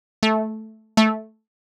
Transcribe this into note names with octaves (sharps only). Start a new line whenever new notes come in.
A3
A3